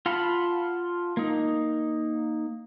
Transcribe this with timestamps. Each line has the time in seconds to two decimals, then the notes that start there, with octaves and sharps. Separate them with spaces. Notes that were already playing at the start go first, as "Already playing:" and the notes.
0.06 F4 F5 F#5 A5 B5
1.17 A#3 D#4